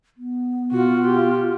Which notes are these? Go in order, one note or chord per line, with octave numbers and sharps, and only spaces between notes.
B3
B2 F4 F#4
G4